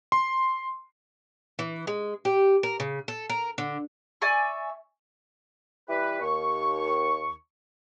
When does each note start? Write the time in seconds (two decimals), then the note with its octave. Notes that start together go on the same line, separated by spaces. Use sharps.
0.12 C6
1.59 E3
1.87 G#3
2.25 G4
2.63 A#4
2.80 C#3
3.08 A4
3.30 A#4
3.58 D3
4.22 D5 E5 G#5 C#6
5.88 E3 G3 E4 G4 B4
6.21 D#2 C#6